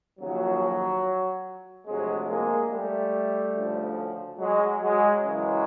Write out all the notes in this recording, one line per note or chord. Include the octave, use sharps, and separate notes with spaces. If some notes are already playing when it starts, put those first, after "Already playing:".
D#2 C#3 F3 F#3
D2 C3 F3 F#3 G#3
G#3 A#3
G3 A3
D2 C#3 F3
F#3 G#3
F#3 G#3
F#2 C#3 E3 F#3 G#3